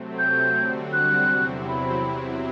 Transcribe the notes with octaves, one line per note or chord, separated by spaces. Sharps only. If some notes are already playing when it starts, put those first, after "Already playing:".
Already playing: C3 F#3 A3 C4
G6
D3 G3 C4 F#4
F#6
E2 C3 F#3 C4 E4
B5